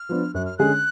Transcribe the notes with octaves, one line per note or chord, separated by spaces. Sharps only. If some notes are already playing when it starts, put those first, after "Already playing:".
Already playing: F6
F3 B3 D4
F#2 F#6
F6
D3 G#3 C#4 G#4 F#6